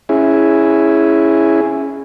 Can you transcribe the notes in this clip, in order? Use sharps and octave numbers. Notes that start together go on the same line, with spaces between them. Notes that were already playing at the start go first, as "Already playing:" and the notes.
C#4 E4 G#4